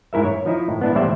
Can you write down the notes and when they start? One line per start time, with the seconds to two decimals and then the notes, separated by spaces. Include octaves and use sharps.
0.13 G#2 E4 A#4 E5
0.25 C#5
0.46 F3 D#4 E4
0.69 A2
0.81 B3 D4 E4
0.95 A2 E3 G3 C5 D5 E5